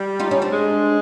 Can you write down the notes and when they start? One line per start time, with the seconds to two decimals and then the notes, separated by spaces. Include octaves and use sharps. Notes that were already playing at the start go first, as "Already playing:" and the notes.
Already playing: G3
0.20 D#4 F4
0.31 C#4 D#4
0.42 C4 D4
0.53 G#3